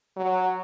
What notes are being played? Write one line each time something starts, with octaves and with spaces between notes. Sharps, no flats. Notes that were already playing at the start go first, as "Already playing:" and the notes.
F#3